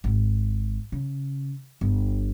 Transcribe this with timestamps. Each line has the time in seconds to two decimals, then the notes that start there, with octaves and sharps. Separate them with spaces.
0.04 G#1
0.92 C#3
1.81 G1